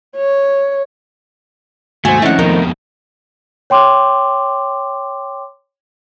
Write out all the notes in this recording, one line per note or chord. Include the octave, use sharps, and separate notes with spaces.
C#5
D#2 G#2 A3 F#4 C5 G#5
D#3 F3 C4 C#4 D#4 E4 F#5
F2 B2 A3 D#4 A#4
C#5 G5 C6 D6